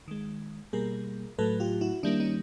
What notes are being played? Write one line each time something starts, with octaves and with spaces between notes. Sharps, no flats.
D#3 G#3
B2 G3 A#3 G#4 A#4
A2 F#3 A3 A4 B4
F4 G4
E4 F#4
D#3 G3 A#3 D4 E4
C#4 D#4